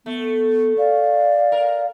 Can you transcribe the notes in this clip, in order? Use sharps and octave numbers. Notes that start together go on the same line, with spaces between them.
A3 B3
D5 F5
A#4